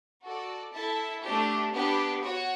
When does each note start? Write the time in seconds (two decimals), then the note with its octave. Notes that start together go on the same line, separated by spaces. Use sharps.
0.22 F#4 A4 D5
0.72 E4 A4 E5 A5
1.22 A3 D4 G4
1.73 B3 D4 G4 B4
2.23 F#4 C#5 F#5